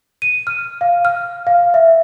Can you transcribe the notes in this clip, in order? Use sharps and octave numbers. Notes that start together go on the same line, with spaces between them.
D#7
F6
F5
F6
F5
E5